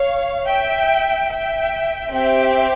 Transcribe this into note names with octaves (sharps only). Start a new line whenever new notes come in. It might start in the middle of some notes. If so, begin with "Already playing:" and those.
Already playing: C#5 F5
E5 G5
E5 G5
C4 G4 E5 G5